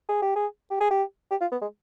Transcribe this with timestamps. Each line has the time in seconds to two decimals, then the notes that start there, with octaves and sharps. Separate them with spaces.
0.09 G#4
0.22 G4
0.36 G#4
0.70 G4
0.80 G#4
0.91 G4
1.31 G4
1.41 F4
1.52 B3
1.61 G#3